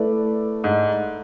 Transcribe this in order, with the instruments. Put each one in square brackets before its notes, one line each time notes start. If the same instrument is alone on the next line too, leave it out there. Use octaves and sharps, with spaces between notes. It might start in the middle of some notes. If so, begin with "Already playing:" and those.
Already playing: [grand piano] A3 E4 B4 D5
[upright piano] G#2